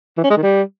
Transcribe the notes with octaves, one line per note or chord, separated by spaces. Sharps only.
E3
C#4
G#3
D#3
G3